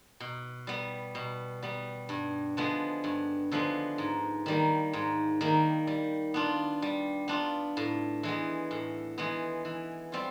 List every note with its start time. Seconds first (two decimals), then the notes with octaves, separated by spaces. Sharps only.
0.20 B2
0.67 G3 B3
1.15 B2
1.63 G3 B3
2.09 G2
2.57 D3 F3 G#3 B3
3.04 G2
3.52 D3 F3 G#3 B3
3.98 G#2
4.46 D#3 G3 A#3
4.93 G#2
5.41 D#3 G3 A#3
5.87 G3
6.34 B3 D4 F4
6.82 G3
7.28 B3 D4 F4
7.77 A2
8.23 E3 G#3 B3
8.71 A2
9.18 E3 G#3 B3
9.65 E3
10.12 G3 C4 F4